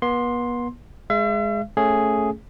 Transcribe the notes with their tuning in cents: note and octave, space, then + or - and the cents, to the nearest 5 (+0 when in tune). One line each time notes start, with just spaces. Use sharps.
B3 -35 C6 +10
G#3 +0 E5 +40
A3 +0 C#4 +0 G#4 +0